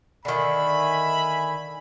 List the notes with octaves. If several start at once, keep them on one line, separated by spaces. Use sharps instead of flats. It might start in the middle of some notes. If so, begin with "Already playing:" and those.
D3 D#3 E5 G#5 B5